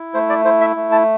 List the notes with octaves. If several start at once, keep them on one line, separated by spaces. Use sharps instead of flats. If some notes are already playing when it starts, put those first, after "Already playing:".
Already playing: E4
A3 C5
D5
E4 C5
E5
A3
A5